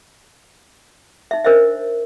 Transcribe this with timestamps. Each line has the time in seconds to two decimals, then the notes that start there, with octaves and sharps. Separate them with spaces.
1.31 D#4 E5
1.45 D4 A#4 C5 D#5 E5